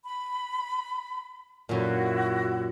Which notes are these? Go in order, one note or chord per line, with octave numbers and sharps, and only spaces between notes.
B5
F#2 A#2 E4 F#4